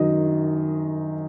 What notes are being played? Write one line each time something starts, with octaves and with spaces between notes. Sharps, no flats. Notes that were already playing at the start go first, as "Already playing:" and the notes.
Already playing: F#2 D#3 F#3 D#5